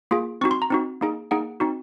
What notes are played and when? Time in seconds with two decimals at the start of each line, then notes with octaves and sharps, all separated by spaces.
0.11 A#3 F4 G#4
0.41 C4 D#4 F#4 C#6
0.51 C6
0.62 A#5
0.70 C4 D#4 F#4
1.01 A#3 D#4 G#4
1.31 A#3 D#4 G#4 F#5
1.60 C4 D#4 F#4